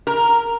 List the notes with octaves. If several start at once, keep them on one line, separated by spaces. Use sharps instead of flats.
A#4